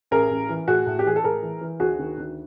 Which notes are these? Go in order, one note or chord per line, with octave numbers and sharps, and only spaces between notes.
A1 G#4 A#4
A1
E3
A2 F#4 G#4
A2
G4
E3 G#4
A4
A2 G#4 A#4
E3
E3
D2 F#4 G#4
D#3
D2